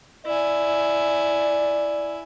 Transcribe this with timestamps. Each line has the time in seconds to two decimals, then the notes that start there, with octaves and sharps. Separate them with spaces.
0.26 E4 D5 G#5